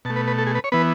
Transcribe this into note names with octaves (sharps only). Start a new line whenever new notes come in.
B2 A3 A5
B4
B4
A4
G#4
B4
C#5
E3 B3 B4